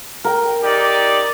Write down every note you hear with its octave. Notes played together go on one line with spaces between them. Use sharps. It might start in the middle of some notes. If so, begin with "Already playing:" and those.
A#4 G5
D#4 G4 D5